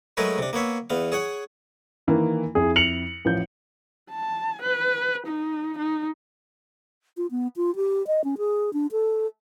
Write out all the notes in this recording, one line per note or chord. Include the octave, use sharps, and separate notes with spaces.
F#3 G#3 A3 G#4 A#4 B4
C3 D4
A#3 B3 C#5 E5
E2 B3 F5
G#4 C#5 F#5
D#3 E3 A#3
F2 E4 G#4
C#7 F7 F#7
A1 F3 G6
A5
B4
D#4
D#4
F4
B3
F4
G4
D#5
C#4
G#4
D4
A4